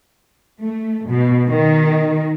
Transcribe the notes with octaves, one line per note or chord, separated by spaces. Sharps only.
A3
B2
D#3